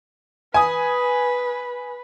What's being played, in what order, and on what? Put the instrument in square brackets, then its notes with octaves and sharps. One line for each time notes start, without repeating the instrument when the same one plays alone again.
[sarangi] B4 [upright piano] G#5 D#6